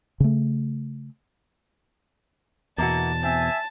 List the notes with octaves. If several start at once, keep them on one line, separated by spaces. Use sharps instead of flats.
C#3 A3
E2 B2 A#3 E4 F#4 A5
C4 E5 G#5